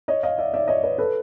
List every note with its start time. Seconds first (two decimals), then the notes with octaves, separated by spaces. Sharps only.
0.08 C#5 D#5
0.23 D#5 F5
0.38 D5 E5
0.54 D5 E5
0.68 C#5 D#5
0.83 B4 C#5
0.98 A4 B4